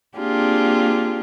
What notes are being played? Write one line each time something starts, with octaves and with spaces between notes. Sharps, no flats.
A#3 C4 D4 F4 G4 G#4